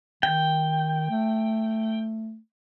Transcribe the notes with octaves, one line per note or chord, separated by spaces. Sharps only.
D#3 G5
A3